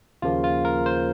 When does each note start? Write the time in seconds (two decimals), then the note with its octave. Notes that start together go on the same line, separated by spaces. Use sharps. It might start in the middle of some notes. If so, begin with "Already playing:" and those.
0.22 D#2 C#3 F3 A#3 F4
0.44 F4
0.65 A#4
0.86 C5